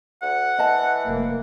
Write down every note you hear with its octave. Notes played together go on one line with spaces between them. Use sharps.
D2 F#5
E3 D#5 A5
F1 A#3